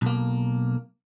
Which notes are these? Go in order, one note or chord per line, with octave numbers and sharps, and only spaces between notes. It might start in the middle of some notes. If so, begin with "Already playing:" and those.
B1 A#3